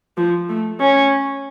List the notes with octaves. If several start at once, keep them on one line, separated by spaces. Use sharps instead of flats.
F3
A3
C#4